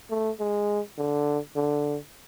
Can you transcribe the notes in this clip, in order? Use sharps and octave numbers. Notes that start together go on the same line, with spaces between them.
A3
G#3
D3
D3